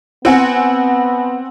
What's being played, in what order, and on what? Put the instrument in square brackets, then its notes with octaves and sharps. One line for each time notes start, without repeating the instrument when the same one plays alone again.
[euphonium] B3 [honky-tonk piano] C4 F#5 G#5